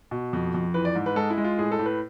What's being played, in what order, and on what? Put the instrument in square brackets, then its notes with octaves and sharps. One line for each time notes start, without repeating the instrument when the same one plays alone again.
[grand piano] B2
F2
F2
E3 B4
D5
G#2
B4
G#3 A4
E4
G#3
F4
A2 G#4
A4
A2
B4